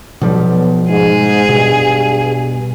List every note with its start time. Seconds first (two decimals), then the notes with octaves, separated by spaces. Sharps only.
0.22 B1 B2 F3 G3
0.89 G#2 G#4
1.49 G2 B2